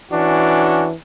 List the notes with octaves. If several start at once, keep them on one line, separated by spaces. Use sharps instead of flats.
E3 C#4 D4 F#4